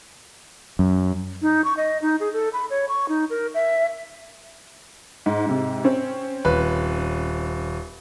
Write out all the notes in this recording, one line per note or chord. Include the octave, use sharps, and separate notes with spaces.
F#2
D#4
C#6
D#5
D#4
G#4
A4
B5
C#5
C#6
D#4
A#4
E5
G#2
G#2 C3
C4 C#4
D#1 B4